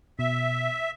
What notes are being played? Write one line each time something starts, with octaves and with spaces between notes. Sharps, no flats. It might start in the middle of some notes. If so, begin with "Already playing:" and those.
B2 E5